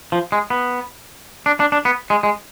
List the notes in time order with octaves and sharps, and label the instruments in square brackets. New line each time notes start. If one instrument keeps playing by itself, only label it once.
[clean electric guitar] F3
G#3
B3
D4
D4
D4
B3
G#3
G#3